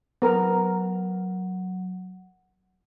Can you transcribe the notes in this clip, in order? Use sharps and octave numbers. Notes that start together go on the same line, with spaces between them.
F#3 B3 A#4